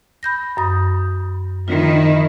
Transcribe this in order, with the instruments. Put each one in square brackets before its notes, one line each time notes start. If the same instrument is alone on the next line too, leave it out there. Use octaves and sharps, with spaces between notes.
[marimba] B5 G6 A#6
F#2 D#6
[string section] D#3 F3 E4 [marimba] F4